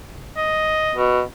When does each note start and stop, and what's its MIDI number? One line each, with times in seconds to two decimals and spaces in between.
0.37 0.99 75
0.94 1.21 47